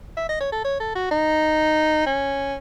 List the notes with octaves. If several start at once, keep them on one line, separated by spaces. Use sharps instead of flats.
E5
D#5
C#5
A4
C#5
A4
F#4
D#4
C#4